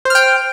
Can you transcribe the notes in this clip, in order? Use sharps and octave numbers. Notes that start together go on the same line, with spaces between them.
C5 G5 F6